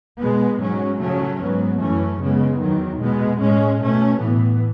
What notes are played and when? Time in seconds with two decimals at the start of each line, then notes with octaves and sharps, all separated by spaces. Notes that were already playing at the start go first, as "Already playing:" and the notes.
0.20 B2 G#3 B3
0.60 G#2 F#3 C#4
1.00 C#3 F#3 A3 C#4
1.40 G#2 F#3 B3
1.80 F#2 E3 A3 C#4
2.20 C#3 G#3 B3
2.60 E2 D#3 F#3
3.01 B2 G#3 B3
3.40 A2 G#3 C#4
3.80 B2 A3 C#4
4.20 A2 E3 B3